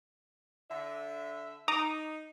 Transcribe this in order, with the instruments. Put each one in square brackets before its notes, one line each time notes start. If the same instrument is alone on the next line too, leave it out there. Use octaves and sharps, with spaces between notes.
[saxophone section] D3 E5
[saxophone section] D#4 [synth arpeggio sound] A#5 D6 D#6